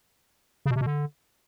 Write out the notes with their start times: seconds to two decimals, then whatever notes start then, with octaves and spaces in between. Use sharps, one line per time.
0.66 C#3
0.71 B2
0.76 C3
0.81 B2
0.86 D3